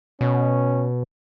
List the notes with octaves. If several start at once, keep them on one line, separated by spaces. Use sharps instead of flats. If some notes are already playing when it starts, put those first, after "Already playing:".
B2 C#4